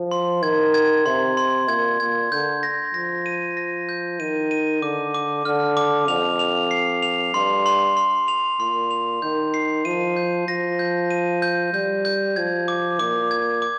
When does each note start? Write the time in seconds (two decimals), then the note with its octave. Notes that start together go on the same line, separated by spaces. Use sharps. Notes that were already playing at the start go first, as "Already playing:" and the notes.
Already playing: F3
0.11 C6
0.43 D#3 G#6
0.74 G#6
1.06 C3 C6
1.37 C6
1.68 A#2 G#6
2.00 A#2 G#6
2.32 D3 G6
2.63 A#6
2.94 F3 A#6
3.26 D#7
3.57 A#6
3.89 G6
4.20 D#3 D#7
4.51 D#7
4.82 D3 D6
5.14 D6
5.45 D3 F6
5.77 D6
6.08 F2 F7
6.39 F7
6.71 C7
7.02 F7
7.34 G2 C6
7.66 C6
7.97 C6
8.28 F7
8.60 A#2 C6
8.91 F7
9.22 D#3 G6
9.54 C7
9.85 F3 D#7
10.16 G6
10.48 F3 A#6
10.79 G6
11.11 D#7
11.42 G6
11.73 G3 G6
12.05 G6
12.36 F3 G#6
12.68 D6
12.99 A#2 D6
13.31 G#6
13.62 D6